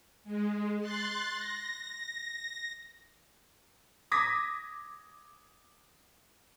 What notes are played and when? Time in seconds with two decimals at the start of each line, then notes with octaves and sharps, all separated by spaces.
0.24 G#3
0.80 C6 F#6 A6
1.36 A#6
4.12 D6 D#6 G#6 A#6 B6